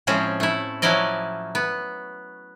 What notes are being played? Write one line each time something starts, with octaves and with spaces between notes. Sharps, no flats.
A2 F3 G#3 C4 C#4
A3 E4
F3 F#3 C#4 E4 D5 D#5
B3